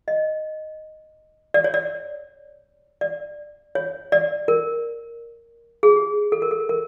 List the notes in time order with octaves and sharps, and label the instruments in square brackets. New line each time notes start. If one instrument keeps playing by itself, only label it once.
[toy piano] D#5
D5
C#5
D5
D5
C#5
D5
A#4
G#4
G4
A4
A#4
A4
A#4